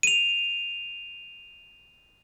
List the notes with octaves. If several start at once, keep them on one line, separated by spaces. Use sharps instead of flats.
D#7 F7